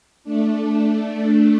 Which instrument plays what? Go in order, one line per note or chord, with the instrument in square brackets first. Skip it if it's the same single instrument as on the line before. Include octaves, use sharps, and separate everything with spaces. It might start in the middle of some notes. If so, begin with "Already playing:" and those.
[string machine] A3 D4